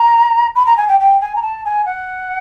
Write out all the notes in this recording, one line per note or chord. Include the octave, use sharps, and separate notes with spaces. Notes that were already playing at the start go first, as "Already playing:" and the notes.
Already playing: A#5
B5
A#5
G#5
G5
G5
G#5
A#5
A5
G#5
F#5